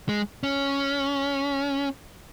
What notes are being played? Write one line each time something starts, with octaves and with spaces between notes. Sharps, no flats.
G#3
C#4